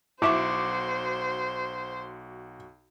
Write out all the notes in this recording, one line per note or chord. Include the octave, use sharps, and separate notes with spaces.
B1 E4 F#4 C5 E5 C#6 D6 E7